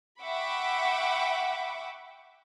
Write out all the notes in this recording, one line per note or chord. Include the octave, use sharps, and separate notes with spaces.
E5 F#5 G5 B5 C#6 D6